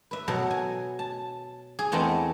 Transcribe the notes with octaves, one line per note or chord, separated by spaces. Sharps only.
B4 E5
B2 F#3 A4
G#5
A5
G#4
E2 A3 B3 C4 D#5 A5